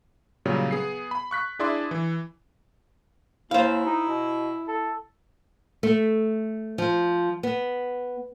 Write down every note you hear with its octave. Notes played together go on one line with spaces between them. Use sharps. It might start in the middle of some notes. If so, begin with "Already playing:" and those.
A#2 C#3 F#3 G3
B3 G#4 C7
B5
C#6 F#6 B6
D4 E4 G#4 D5 E5 C6
E3
D#2 E4 C5 F5
D#4
B2
A4
A3
F3
B3